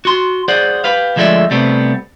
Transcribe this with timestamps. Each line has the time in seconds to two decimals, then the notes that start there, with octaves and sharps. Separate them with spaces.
0.05 F#4 C6
0.48 G#4 C5 D5 F#5
0.84 G4 B4 F5
1.16 D2 F3 G#3 A3 D5 E5
1.51 C3 G3 A3 B3 C4